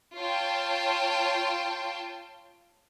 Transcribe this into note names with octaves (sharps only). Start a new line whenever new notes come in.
F4 C#5 G5 A5